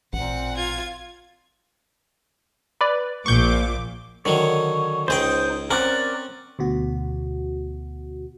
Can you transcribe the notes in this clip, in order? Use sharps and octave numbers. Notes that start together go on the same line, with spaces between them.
A1 A#2 C4 F#5
F4 G#6
B4 D5
A#1 A#2 C#6 D6 G6
D3 D#3 F#3 C#5
C#2 D#4 G#4 C5 G5
C4 C#4 A#4 D5 F#5 F#6
D2 B2 F#4